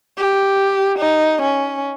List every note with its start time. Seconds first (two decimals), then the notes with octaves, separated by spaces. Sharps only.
0.18 G4
0.99 D#4
1.42 C#4